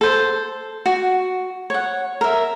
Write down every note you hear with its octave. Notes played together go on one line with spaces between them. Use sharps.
A4 C5
F#4
C#5 F#5
A#4 E5